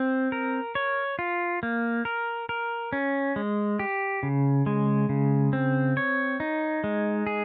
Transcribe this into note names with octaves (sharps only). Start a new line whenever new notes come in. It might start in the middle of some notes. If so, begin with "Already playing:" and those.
Already playing: C4
A#4
C#5
F4
A#3
A#4
A#4
C#4
G#3
G4
C#3
G#3
C#3
C4
C#5
D#4
G#3
G#4